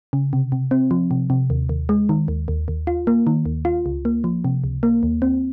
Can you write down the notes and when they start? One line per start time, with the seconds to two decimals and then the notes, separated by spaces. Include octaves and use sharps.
0.13 C#3
0.33 C3
0.52 C3
0.71 C4
0.91 F3
1.11 C3
1.30 C3
1.50 D#2
1.69 D#2
1.89 G#3
2.09 D#3
2.28 D#2
2.48 D#2
2.68 D#2
2.87 F4
3.07 A#3
3.27 D#3
3.46 D#2
3.65 F4
3.86 C#2
4.05 A#3
4.24 F3
4.45 C3
4.64 C#2
4.83 A#3
5.03 D#2
5.22 C4